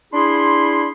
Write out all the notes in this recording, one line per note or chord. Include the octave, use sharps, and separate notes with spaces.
D4 E4 G#4 B5 C6